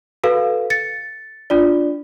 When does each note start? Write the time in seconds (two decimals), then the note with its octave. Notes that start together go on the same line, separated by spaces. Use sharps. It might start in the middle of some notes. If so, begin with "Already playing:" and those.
0.23 F#4 A4 B4 F5
0.70 A6 C#7
1.50 D4 F4 D5